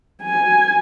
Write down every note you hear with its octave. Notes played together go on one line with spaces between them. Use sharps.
G#5